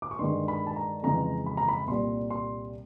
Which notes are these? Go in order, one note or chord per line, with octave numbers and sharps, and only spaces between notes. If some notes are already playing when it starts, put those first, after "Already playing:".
D6
C#6
G2 D#3 G#3 C6
B5
A5
A#5
F2 C#3 E3 G#3 A#5
B5
A#5
B5
C2 A#2 G3 C6
C6